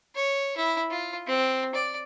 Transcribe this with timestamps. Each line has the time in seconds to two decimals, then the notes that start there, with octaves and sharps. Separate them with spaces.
0.15 C#5
0.57 E4
0.91 F4
1.27 C4
1.75 D5